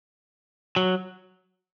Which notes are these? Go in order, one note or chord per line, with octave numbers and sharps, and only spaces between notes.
F#3